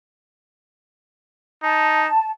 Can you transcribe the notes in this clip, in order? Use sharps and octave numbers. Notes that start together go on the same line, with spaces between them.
D#4 A5